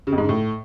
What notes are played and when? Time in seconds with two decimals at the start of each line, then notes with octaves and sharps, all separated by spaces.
0.07 C#3
0.12 F2
0.18 G#2
0.23 C#3
0.29 A2